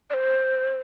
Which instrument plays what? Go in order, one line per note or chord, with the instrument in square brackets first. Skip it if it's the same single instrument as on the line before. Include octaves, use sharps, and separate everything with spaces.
[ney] D5
C5